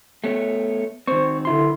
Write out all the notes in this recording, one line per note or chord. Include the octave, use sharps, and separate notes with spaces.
A3 B3 C#5
D#3 C4 C5 C#6
D3 E4 C6